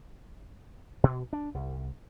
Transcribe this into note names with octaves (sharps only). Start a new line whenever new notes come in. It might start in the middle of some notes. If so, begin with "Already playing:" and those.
B2
D4
C2